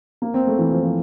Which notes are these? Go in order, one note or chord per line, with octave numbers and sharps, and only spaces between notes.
A#3
C4
A3
E3
F3
F3